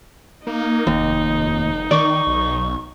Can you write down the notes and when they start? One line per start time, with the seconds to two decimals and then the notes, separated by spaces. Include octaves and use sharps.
0.47 A#3 D#4
0.87 F1 D#2
1.91 D#3 D5 C#6
2.27 B1